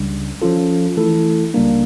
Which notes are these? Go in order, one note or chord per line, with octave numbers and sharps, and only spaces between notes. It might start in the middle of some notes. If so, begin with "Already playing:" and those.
Already playing: C#2 C#3 G3 D4
F3 C#4 F4 A4
E3 A3 E4 A4
C#2 C#3 G3 A#3 D4